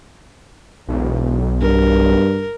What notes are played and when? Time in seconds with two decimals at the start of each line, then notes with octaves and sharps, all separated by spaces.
0.88 E1 B1
1.61 G2 A#4